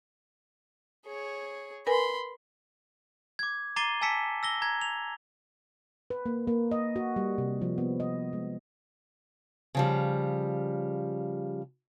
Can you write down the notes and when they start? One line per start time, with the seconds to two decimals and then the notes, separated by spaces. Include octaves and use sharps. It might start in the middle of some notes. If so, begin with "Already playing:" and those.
1.06 G#4 C#5
1.87 A#4 B4 G#5 B5 C6
3.39 D6 G#6
3.76 A#5 D6 A6 C7 D#7 G7
4.01 G#5 A5 E6 B6 C#7 E7
4.43 E6 A#6 G7
4.62 A#5 G#6
4.81 F7
6.10 B4
6.26 A#3
6.47 A#3
6.71 D#5
6.96 F#4
7.16 G3
7.38 C3
7.62 F3
7.78 B3
8.00 D#5
8.33 G#3
9.75 C#3 F3 G3